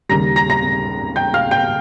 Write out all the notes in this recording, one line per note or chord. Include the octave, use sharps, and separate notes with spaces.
D#2 C#3 G3 A#5 A#6
A#5 A#6
A#5 A#6
G5 G6
F5 F6
G5 G6